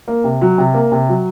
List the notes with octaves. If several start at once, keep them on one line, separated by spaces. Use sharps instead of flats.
A#3
C3
F#3
C3
A#3
C3
F#3